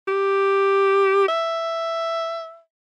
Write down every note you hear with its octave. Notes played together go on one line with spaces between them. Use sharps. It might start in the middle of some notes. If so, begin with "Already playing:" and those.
G4
E5